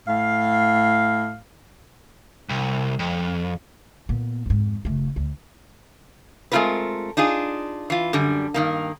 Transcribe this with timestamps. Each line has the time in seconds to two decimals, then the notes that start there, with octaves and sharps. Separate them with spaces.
0.08 A2 F5
2.49 C2
2.99 F2
4.09 A#2 B3
4.46 F2 G#2
4.85 F#1 A3
5.16 D2
6.52 G#3 A3 C4 F4 A#4 B4
7.17 D4 D#4 F4 G#4
7.90 E3 F4
8.13 F#2 D3 G3
8.54 G2 D#3 A#3